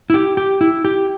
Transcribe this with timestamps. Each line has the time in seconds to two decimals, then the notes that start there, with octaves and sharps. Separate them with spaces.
0.10 E4
0.14 G4
0.37 G4
0.61 E4
0.85 G4